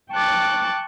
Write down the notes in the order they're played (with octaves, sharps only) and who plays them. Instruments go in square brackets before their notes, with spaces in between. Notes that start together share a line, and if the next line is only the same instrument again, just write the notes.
[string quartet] G5 A5 C#6 D6 F#6 A6